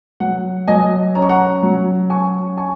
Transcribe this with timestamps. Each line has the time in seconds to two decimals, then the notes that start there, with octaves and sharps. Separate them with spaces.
0.20 F#3 F#5
0.67 F#3 D#5 G#5
1.15 C#4 A#5
1.22 C#6
1.29 F#5 A#5
1.63 F#3
2.10 C#4 G#5 C#6
2.57 G#5 C#6